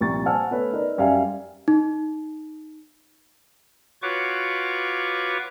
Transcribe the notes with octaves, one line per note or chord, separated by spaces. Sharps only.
C2 A#2 F3 C#6 A6
C5 F#5 G#5 A5 E6 F6
A3 B3 B4 C#5
D#4 A#4 B4 D5
F#2 G3 E5 F5 G#5
D#4
F4 F#4 B4 C#5 C#6 D6